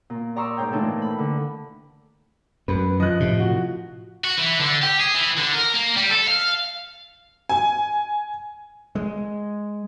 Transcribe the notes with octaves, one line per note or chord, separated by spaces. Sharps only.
A#2
D5 A#5 C6 C#6 D#6 E6
G#2 C5 C#5 G5 G6
A#2 E3 A3 D4 D#4 A4
B5
D3
F#2 B4
F3 D#5 F#6
A2 C3
F#4
F#4
E3
D3
G4
G#4
E3
D3
A#4
A#3
G3
A4
F5
G#5
G#3